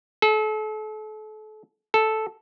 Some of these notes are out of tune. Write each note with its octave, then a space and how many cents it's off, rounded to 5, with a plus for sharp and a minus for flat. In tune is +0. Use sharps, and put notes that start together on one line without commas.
A4 -35
A4 -5